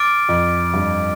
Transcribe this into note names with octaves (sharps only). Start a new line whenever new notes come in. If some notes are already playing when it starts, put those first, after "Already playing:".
Already playing: D6 F6 A6 D7
F2
G2